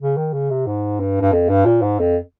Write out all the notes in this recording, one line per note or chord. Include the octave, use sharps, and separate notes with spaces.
C#3
D#3
C#3
C3
G#2
G2
G2
F2
G2
A#2
G#2
F2